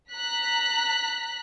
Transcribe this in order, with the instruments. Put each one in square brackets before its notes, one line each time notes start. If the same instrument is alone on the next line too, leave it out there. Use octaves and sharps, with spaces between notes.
[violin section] A#5 F#6 B6